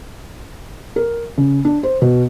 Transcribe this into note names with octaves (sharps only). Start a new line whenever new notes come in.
A#4
C#3
D4
C5
B2